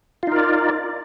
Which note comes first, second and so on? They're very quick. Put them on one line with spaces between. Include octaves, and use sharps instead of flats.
F4 D#4 A#4 D5